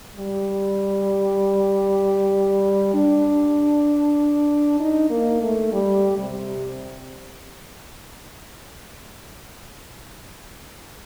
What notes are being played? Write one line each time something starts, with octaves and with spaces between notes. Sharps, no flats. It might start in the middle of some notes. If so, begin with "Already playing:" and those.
G3
D4
D#4
A#3
A3
G3
C3